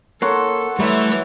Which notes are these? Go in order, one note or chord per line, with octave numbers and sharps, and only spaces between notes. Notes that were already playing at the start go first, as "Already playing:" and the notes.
A#3 A4 C#5 F#5 C6
E3 F#3 G3 A3 E5